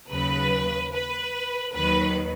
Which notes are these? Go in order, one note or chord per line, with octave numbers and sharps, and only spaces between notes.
D#2 C#3 F#3 B4
B4
D#2 D#3 F#3 B4